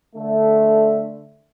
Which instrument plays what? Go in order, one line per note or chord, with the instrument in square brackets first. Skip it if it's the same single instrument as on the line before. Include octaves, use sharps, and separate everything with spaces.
[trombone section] D3 A3